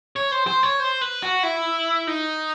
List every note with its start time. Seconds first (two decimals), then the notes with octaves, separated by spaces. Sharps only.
0.16 C#5
0.31 C5
0.47 C5
0.63 C#5
0.80 C5
1.01 B4
1.23 F#4
1.43 E4
2.07 D#4